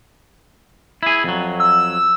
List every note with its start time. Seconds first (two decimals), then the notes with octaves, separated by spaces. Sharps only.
1.03 E4 G#4
1.24 F2 F#3
1.60 E6